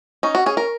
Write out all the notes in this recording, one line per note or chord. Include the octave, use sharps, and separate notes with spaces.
C#4 D#4
F#4
C#4 G#4
A#4